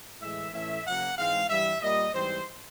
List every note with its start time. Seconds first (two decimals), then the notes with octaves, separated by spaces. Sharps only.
0.21 A2 E3 G#3 E5
0.53 A2 E3 A3 C#4 E5
0.86 C#3 F#3 A#3 F#5
1.18 G#2 E3 G#3 C4 F5
1.50 G2 E3 G3 E5
1.82 A#2 G3 A#3 D#5
2.14 G#2 E3 G3 C4 C5